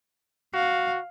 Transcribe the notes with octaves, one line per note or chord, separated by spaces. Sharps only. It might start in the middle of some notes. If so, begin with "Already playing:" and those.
F#4 F5